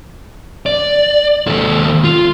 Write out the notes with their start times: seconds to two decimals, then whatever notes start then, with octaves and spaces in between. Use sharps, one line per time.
0.66 D5
1.47 D#2 A4
2.04 F4